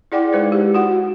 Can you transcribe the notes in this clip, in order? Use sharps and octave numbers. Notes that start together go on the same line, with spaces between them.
E4 G#4 D5 F#5 G5 D6
G#3 D#4 B4 C5
G4
F#4 F#5